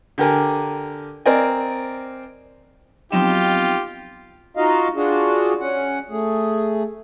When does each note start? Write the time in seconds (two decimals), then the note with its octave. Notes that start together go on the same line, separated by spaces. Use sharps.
0.18 D3 G4 A#4 G#5
1.26 C4 A#4 D5 D#5 G#5
3.12 F3 F#3 B3 C4 D#4 F4 G4 G5
4.57 D#4 F4 F#4 D#5 F5
4.96 D4 F4 F#4 G#4
5.60 C#4 F#5
6.10 A3 G#4